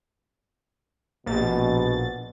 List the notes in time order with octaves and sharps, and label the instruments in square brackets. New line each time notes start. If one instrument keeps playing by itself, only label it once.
[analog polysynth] A#1 A6 [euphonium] B2